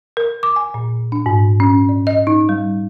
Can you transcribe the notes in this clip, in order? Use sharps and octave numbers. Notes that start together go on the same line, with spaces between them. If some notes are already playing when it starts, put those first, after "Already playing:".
A#4
D6
G#5
A#2
D4
G#2
C#4
D5
D#5
D#4
G3